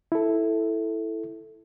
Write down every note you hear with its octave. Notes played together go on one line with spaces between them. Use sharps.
E4 A4